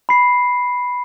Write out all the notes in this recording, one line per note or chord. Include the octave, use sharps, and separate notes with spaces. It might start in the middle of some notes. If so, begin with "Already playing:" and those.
B5 C7